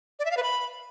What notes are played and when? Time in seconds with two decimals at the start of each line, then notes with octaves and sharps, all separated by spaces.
0.19 D5
0.25 E5
0.31 F5
0.37 B4
0.43 B5